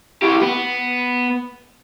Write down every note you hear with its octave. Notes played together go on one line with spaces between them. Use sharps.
E4 G4
B3